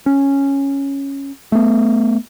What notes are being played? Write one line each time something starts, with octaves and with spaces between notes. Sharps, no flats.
C#4
A3 B3